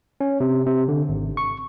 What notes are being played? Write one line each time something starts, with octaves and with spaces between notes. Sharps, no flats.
C#4
C3
C3
D3
G#1
C#6